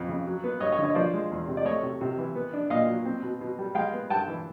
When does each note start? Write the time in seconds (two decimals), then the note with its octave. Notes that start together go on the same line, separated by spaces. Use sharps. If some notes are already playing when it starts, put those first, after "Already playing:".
Already playing: F2 B3
0.09 C#3
0.26 F#3
0.44 B3
0.60 G2 C#5 D#5
0.72 C#5 D#5
0.78 D3
0.84 C#5 D#5
0.95 F3 C5 D5
1.14 G#3
1.31 E2
1.48 C3
1.57 D5
1.65 A3 C#5 D#5
1.83 C3
2.01 C3
2.18 E3
2.35 B3
2.53 D4
2.70 A#2 D#5 F5
2.87 F#3
3.05 C4
3.23 B2
3.41 B2
3.58 G3
3.75 G#3 F5 G5
3.93 B3
4.10 G2 G5 A5
4.28 E3